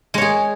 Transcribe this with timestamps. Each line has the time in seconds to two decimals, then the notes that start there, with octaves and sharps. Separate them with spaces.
0.14 G#3
0.18 C#5
0.21 G#4